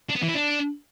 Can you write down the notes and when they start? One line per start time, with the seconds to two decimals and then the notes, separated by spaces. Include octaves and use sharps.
0.09 D4
0.16 B3
0.22 E3
0.28 E4
0.35 D4